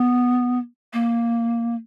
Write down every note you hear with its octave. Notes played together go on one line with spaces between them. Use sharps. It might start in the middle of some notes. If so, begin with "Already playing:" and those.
Already playing: B3
A#3